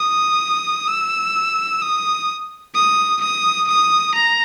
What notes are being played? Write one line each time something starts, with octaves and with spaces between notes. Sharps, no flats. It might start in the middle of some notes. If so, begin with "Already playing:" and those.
Already playing: D#6
E6
D#6
D#6
D#6
D#6
A#5